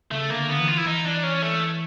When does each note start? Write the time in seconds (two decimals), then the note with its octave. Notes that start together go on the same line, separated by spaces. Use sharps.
0.11 C#3 A3
0.30 D3 A#3
0.49 B3
0.59 E3
0.68 F4
0.77 E4
0.86 E3 D#4
1.05 D4
1.24 C#4
1.42 A3